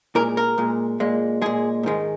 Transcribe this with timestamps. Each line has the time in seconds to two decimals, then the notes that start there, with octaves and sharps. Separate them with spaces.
0.15 A#2 G#3 A#4
0.37 A#4
0.58 A#2 G#3
1.00 A#2 G#3
1.42 A#2 G#3 G#4
1.83 G#2 D#3 G#3